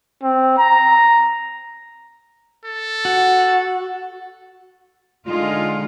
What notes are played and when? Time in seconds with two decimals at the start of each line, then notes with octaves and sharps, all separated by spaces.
0.23 C4
0.58 A#5
2.65 A4
3.05 F#4
5.27 D3 G#3 D#4 F4